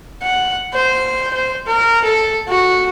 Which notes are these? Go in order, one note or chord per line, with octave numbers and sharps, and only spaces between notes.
F#5
C5
C5
A#4
A4
F#4